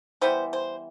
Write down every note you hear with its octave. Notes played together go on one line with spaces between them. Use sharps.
E3 G3 B3 C5
C5